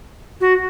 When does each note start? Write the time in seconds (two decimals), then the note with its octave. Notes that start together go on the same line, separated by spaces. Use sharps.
0.41 F#4